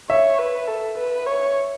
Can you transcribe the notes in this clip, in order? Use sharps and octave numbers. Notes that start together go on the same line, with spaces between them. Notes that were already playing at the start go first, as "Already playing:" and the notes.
C#5 E5
B4
A4
B4
C#5